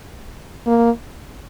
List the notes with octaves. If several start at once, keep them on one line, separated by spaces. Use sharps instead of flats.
A#3